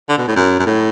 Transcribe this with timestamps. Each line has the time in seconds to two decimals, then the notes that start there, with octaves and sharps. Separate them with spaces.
0.09 D3
0.18 B2
0.28 A2
0.36 F#2
0.59 F#2
0.66 A2